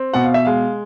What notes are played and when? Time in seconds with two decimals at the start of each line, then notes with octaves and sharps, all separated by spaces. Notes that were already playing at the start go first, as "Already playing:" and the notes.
Already playing: C4
0.13 B2 F#5
0.24 F5
0.34 E5
0.45 G#3 F5